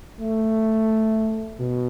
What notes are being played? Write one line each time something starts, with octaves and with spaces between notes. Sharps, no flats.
A3
B2